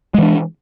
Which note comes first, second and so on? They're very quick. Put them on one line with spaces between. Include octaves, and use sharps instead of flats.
G#3 E3 D4